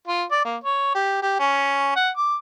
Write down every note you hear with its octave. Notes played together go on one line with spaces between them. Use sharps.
F4
D5
A#3
C#5
G4
G4
C#4
F#5
D6